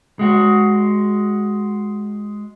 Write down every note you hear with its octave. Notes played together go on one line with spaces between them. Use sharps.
G#3 F#4